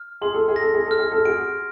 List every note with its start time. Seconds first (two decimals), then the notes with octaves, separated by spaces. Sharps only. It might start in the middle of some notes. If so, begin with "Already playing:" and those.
Already playing: F6
0.21 G#4 C6
0.34 A4
0.48 G#4
0.56 A4 A#6
0.74 G#4
0.86 A4 F6
0.99 G#4
1.12 A4
1.25 F#4 G#4 D7